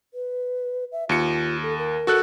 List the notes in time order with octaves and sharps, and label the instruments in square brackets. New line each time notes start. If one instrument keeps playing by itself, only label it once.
[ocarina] B4
E5
[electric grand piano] D#2 C#7 [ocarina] F4
[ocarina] A4
A#4
[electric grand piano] F#4 A4 F#6